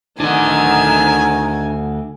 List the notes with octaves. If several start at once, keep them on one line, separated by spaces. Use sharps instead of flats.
D2 D#3 D4 D#5 F#5 G#5